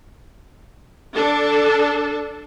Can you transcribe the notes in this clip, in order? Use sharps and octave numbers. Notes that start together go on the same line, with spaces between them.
D4 A4